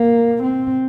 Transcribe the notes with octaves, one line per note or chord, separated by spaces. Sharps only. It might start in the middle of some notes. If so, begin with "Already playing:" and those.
Already playing: A#3
C4